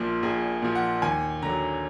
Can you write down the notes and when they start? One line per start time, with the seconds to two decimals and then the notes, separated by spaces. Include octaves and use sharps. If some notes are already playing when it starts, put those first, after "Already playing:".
Already playing: A#1 A#2 F3
0.23 A#1 G#4
0.62 A#2 F3
0.75 F#5
1.02 D#2 G#5
1.42 D3 F#3 A#5